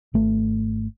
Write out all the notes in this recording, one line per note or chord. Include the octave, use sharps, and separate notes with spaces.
G#1 A3